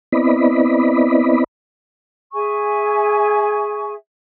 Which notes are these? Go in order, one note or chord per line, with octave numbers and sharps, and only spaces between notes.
B3 C4 E4 D5 D#5 B5
G#4 E5 G#5 C#6